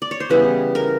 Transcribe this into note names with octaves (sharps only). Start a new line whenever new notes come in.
D5
C#5
C5
C#3 E3 G3 B3 B4
A#4